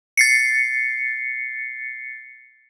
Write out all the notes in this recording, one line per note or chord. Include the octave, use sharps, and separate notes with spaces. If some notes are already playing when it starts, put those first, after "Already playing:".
A6 C7 C#7